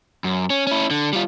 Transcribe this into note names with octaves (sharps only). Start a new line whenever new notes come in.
F#2
C#4
C#4 E4
D3
G3 F4